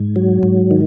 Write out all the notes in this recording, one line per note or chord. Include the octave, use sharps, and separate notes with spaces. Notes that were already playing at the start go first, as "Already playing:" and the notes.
Already playing: G#2
F#3
G#2
D#3